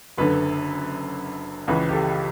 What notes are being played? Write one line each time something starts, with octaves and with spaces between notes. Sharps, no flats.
F#1 F#2 D3 B4
C#2 C#3 E3 B4
G4
A4